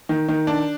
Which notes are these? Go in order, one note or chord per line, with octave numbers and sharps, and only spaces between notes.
D#3
D#3
D4